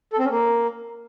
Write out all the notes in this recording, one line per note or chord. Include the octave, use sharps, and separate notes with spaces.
A4
C4
C#4
A#3